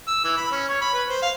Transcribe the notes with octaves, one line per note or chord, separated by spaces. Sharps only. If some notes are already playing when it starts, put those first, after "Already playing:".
E6
E3
B5
C#4
C#5
B5
B4
C5
F5